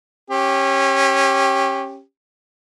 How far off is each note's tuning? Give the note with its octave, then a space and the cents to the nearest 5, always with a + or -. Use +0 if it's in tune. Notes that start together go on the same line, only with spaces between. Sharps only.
C#4 -25 G4 +0